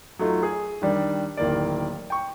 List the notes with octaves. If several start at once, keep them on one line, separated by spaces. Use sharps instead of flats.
F#3 A3 D#4 F4
G#4
D#3 G3 D4
D1 D#3 A#3 D5
G5 C#6